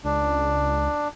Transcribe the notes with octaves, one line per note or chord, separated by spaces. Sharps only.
C#2 D4